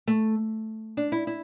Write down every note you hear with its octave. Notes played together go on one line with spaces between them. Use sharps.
A3
D4
E4
E4